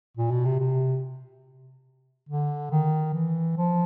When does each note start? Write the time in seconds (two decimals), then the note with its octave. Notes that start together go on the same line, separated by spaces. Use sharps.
0.17 A#2
0.31 B2
0.45 C3
0.60 C3
2.29 D3
2.71 D#3
3.14 E3
3.57 F3